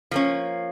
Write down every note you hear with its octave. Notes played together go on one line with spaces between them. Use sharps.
F3 A#3 C#4